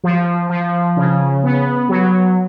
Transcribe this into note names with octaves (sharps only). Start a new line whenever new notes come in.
F3
F3
C#3
B3
F#3